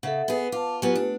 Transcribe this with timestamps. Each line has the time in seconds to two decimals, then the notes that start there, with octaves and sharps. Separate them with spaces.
0.03 C#3 A4 E5 F#5
0.28 B3 G#4
0.52 F4 A5 D6
0.82 F#3 B3 F4 G4 G#5
0.95 A3 D4